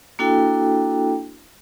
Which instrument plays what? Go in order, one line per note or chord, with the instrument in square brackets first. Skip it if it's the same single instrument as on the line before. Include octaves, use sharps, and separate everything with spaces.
[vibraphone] A#3 D4 E4 F#4 A4 G5